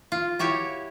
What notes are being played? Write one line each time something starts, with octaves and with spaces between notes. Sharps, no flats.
F4
E4 F#4 G4 C#5